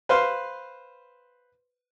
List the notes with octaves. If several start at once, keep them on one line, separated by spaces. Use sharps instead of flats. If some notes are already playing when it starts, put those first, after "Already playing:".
B4 C5 F5 C6